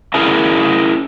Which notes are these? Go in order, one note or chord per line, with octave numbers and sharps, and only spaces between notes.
C#4 E4 G#4 A#4